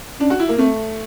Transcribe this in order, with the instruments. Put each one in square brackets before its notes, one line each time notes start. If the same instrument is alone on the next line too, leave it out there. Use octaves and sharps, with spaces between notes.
[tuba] C#4 [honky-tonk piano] D4
[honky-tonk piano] F#4
E4
A#3
[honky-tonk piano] A3 [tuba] C4